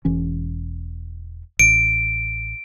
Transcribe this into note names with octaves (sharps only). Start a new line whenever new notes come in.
E1 E3 C#4
A1 D7